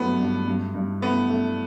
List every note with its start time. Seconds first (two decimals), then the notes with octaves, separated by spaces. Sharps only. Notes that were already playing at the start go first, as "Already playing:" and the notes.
Already playing: G2 F#3 A3 B3
0.20 G2
0.47 G2
0.74 G2
1.01 A3 B3
1.29 A3